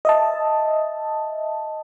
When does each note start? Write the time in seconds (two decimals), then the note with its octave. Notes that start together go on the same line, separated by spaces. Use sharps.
0.05 D#5 E5 A5